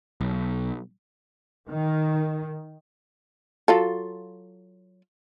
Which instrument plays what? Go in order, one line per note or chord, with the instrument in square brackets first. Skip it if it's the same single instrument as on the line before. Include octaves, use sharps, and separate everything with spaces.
[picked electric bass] B1
[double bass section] D#3
[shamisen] F#3 F4 A4